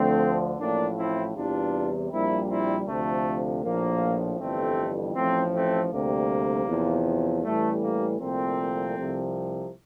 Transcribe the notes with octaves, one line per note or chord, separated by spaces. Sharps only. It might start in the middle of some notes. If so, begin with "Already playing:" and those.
Already playing: D2 D3 F3 A3 C4
A1 A2 F3 A#3 D4
C4 E4
E2 C3 E3 G3 D4 F4
A#1 A#2 G3 C4 E4
C4 E4
D2 C3 F3 A3
A#1 A2 F3 A#3
G1 F2 E3 G3 A3 C4
A1 A2 F3 A3 C4
A3 C4
D2 C3 G3 A#3
E2 C3 F3
A1 A2 E3 G3 A3
A#3
C2 A#2 F3 A3 C4
C2 C3 F3